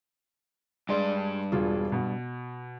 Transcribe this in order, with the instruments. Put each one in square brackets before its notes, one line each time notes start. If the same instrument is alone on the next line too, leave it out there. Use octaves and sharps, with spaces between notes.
[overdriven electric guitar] G2 D5 [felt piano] G#3 C6
[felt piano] E1 F4 G#4
B2